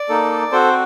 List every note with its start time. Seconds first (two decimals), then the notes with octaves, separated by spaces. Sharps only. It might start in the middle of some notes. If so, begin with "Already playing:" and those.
Already playing: D5
0.09 A#3 D#4 A4
0.52 C4 F#4 A4 C5